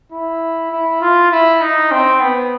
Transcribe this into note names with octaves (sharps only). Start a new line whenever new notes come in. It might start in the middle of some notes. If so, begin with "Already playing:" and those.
E4
E4
F4
E4
D#4
C4
B3